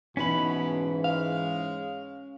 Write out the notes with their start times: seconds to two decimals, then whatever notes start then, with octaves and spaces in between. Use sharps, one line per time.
0.17 G#2 B2 E3 C#4 B5
1.04 G#3 F5